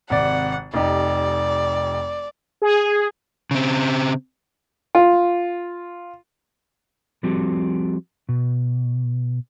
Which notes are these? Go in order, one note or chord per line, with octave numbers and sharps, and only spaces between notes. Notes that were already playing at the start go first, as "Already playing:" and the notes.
G#1 C3 D5 F#5
F1 D#4 G4 D5
G#4
C#3 C4
F4
F3 G3 C4 F#4 G4 A4
B2